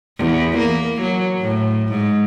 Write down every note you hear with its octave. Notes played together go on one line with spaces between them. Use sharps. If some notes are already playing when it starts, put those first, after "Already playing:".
E2
A#3
F#3
A2
G#2